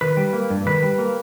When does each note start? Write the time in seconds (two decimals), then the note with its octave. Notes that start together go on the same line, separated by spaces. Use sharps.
0.01 D#3 B4
0.17 G3
0.33 A#3
0.50 G2
0.66 D#3 B4
0.83 G3
0.98 A#3